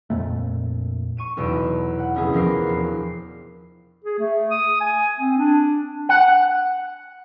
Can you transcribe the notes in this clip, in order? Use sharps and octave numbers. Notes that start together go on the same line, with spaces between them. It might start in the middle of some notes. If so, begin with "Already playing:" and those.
F2 A#2 A3
C#6 D#7 E7
B1 E2 B2 D#4 D7 E7
F#5
F1 C#2 F3 B3 E4 G#4
E2 F3 B3 A#4 D6 C7
E1 C7
G#4
A3
D#6
G#5
C4
D4
F#5